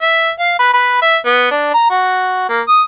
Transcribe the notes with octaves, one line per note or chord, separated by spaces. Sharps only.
E5
F5
B4
B4
E5
B3
D4
A#5
F#4
A#3
D#6